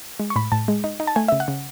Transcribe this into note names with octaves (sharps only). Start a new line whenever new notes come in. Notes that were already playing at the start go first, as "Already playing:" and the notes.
G#3
C#6
A2 B5
A2 A5
G#3
D#4
D#4
A5
A3 G#5
C#3 E5
F#5
C#3